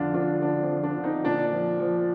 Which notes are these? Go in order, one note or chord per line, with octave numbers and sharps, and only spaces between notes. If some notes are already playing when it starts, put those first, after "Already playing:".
Already playing: F2 D3 D4 F4
F3 D4 F4
D3 D4
C4
F3
D4
D3
C4 D#4
A#2 D4
F3
F3